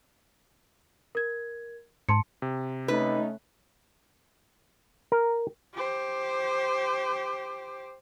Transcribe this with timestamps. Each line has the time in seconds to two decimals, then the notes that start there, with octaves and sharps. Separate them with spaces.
1.15 A#4 G#6
2.09 G#2 A5 C6 C#7
2.42 C3
2.88 A3 C#4 D#4 B4
5.12 A#4
5.75 G4 C5